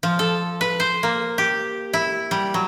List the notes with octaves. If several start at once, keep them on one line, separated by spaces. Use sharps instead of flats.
F3
A4
B4
C5
A#3
G4
E4
G3
F#3